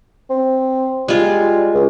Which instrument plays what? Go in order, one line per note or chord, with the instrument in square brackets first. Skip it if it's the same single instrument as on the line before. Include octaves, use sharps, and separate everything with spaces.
[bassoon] C4
[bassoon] G3 [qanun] G#3 F4
[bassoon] C#2